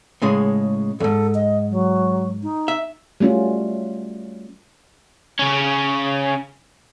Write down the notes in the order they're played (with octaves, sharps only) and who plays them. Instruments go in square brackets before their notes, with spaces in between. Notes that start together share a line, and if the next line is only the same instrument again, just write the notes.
[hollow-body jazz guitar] A2 C#3 G#3
[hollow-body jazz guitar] F2 G#2 [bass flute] A4
[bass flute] D#5
F#3
D#4
[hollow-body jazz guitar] E5
[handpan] G3 A3 C#4 F4 F#4
[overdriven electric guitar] C#3 C#4